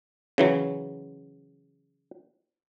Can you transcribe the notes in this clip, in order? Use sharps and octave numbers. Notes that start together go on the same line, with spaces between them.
C#3 E3 F#3